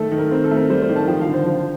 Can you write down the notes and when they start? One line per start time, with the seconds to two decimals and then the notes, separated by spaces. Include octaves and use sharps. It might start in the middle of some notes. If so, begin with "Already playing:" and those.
Already playing: D#3 A3 A4
0.12 D#3
0.18 A#4
0.31 C4 A#4
0.44 A4
0.51 A3
0.57 A#4
0.70 G3 C5
0.82 C5
0.89 D#3
0.96 A5
1.08 F3 G5
1.21 F5
1.27 D3
1.34 C5
1.46 F3 C5